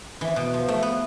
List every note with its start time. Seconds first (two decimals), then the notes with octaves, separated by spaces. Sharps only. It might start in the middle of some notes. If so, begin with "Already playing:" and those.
0.21 E3
0.36 B2
0.54 F3
0.68 A3
0.83 B3